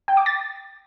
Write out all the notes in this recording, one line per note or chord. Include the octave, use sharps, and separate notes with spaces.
G5
D6
A6